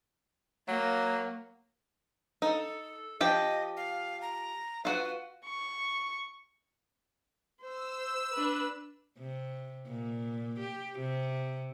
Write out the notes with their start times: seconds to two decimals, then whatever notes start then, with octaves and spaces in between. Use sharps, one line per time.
0.68 F#3 A#3
2.42 D#4 A4
3.21 F3 G4 D#5 G5
3.77 F5
4.22 A#5
4.85 F4 F#4 B4 F#5
5.45 C#6
7.62 C5 E6
8.34 D4 B4
9.18 C3
9.87 A#2
10.60 G4
11.00 C3